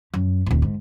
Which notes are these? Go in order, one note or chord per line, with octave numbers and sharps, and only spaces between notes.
F#2
D1 A2
G#2